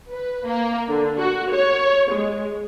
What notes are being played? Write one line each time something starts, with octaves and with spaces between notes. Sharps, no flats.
B4
A#3
D3
F#4
C#5
G#3